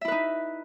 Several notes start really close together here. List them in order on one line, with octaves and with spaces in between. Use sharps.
E5 E4 B4 D#4